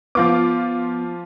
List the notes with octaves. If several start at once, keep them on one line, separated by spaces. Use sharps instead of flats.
F3 B3 F4 D6